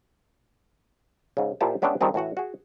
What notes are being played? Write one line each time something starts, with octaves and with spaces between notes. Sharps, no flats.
G#2 C#3
A#2 E4 F4 G4 C5 A5
G#3 B3 C#4 D4 E5 G5
D#3 F3 G3 C4 G#4
A2 E3 F#4 F#5
F#4 G#4